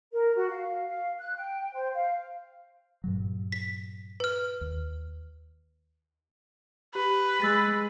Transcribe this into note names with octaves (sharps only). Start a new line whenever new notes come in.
A#4
F#4
F5
F5
F#6
G5
C5
F5
G2 A#2 F#3
B6
B4 F6
D#2
G4 B4
G#3 E6 A6 B6